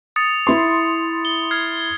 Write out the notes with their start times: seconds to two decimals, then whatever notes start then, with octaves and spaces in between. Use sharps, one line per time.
0.16 D#6 A6 C#7
0.47 E4 C6
1.25 G7
1.51 F6 G#6 C7